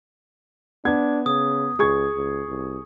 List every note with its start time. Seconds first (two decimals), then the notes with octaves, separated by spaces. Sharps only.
0.85 B3 D4 G#6
1.26 C#3 D#6
1.79 C#2 G#4 C#6 G#6
2.16 C#2
2.48 C2